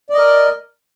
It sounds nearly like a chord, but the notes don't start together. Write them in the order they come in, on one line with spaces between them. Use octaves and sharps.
D5 D#5 A#4